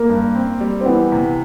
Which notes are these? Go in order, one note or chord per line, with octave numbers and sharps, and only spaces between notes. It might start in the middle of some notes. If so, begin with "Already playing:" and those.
Already playing: A#3
G2
C4
G3
C4
E3 B3
C3